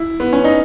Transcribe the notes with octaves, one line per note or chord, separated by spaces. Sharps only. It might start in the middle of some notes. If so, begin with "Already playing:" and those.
Already playing: E4
B3
C#4
D#4